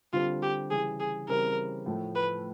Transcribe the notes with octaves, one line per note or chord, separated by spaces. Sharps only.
D3 G3 C4 F4
G4
C#3 E3 G3 G#4
G#4
C#3 E3 G3 C4 A#4
A2 F3 A3
B4